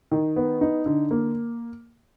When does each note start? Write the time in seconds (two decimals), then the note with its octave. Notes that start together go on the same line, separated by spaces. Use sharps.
0.11 D#3
0.36 B3
0.61 D#4
0.86 D3
1.11 A#3